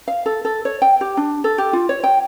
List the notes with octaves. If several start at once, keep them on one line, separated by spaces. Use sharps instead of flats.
F5
A4
A4
C#5
G5
G4
D4
A4
G4
F4
C#5
G5